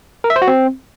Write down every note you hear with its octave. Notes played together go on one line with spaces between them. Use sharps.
A#4
E5
C5
F#4
C4